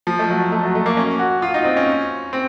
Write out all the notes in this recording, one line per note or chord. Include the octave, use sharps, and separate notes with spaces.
F3
A3
F#3
A3
F#3
A3
A#3
C#4
F#4
F4
D#4
C4
C#4
C4